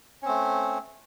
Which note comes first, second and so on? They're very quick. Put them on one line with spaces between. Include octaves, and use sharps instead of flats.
C#4 C4 A3